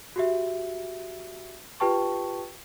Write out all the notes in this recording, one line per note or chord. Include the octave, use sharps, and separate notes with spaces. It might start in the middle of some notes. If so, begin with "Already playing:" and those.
F#4 G4 E5
F4 G4 B4 G5 A5 C#6